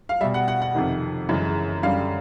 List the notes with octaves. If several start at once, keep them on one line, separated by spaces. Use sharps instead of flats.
F5
B2 G3 E5
F#5
F#5
F#5
F2 C3 D#3
F#2 C#3 E3 G#3
F#2 D3 G3 F5